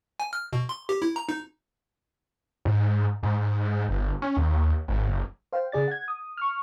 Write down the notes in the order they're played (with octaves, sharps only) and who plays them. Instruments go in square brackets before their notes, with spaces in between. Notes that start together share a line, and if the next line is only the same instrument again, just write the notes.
[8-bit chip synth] G#5
F6
B2
C6
G4
E4
A#5
D#4
[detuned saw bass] G#2
G#2
G1
C#4
D#2
G#1
F#1
[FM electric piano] C5 F5 G5
C#3 G#4 D5 A6
F#5 G#6
D#6
C#6 F6